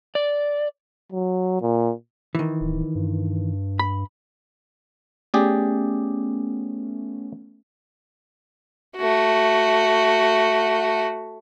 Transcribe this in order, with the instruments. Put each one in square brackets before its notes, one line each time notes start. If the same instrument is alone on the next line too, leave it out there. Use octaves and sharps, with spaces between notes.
[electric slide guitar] D5
[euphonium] F#3
A#2
[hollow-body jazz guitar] D#3 E3
[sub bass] D1
G2
[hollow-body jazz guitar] B5
[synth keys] A3 B3 C#4 [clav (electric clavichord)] G4 G#4 D5
[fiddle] A3 F#4